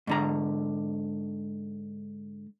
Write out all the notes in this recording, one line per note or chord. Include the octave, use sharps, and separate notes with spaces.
G#2 D3 A#5